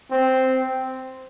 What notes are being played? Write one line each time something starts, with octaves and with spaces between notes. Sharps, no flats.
C4